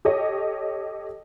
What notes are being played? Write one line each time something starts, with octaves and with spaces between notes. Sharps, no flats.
G4 A4 C#5 D#5